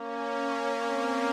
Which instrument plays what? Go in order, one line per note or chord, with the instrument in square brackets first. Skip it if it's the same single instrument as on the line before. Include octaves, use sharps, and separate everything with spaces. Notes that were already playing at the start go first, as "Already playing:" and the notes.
Already playing: [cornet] A#3 [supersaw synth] C#4
[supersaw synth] C4